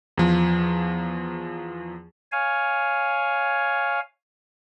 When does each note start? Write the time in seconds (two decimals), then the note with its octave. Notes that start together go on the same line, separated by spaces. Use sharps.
0.17 E2 F3
2.32 C#5 F5 G#5